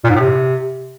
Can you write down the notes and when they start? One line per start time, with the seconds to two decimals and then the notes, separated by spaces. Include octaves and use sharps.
0.04 A#2
0.10 G#2
0.15 A2
0.20 C3